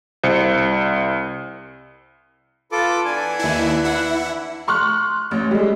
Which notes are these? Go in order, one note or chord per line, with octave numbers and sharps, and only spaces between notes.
C2 C5 C#7
F4 A4 B4 D6
E3 B3 D4 G#5
D#2 E4
E4 F#5
C6 C#6 F6 F#6
A1
G3 G#3